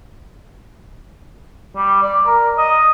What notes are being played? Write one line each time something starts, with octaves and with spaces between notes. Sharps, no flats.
G3
D5
A#4
D#5